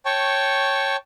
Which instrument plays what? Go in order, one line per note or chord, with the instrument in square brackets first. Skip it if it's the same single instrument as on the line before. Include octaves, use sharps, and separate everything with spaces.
[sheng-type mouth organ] C#5 G5 A5 C#6